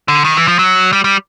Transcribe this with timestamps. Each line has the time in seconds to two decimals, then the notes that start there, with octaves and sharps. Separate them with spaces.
0.08 D3
0.24 D#3
0.37 E3
0.48 F3
0.59 F#3
0.93 G3
1.04 G3